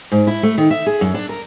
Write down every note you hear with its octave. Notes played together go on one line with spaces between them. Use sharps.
G#2
E4
A3
D#3
E5
G#4
F#2
D4
A#4